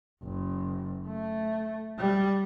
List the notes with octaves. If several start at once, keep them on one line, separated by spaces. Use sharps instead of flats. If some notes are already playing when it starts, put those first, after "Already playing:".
F#1
A3
G3